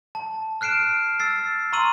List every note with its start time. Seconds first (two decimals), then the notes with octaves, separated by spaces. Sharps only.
0.15 A5
0.61 F6 F#6 C7 D7 E7
1.20 E6 A6 C7
1.72 A#5 C6 C#6 E6 D#7 F#7